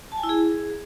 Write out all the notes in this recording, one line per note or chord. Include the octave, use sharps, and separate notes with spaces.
A5
G#5
E4
G#4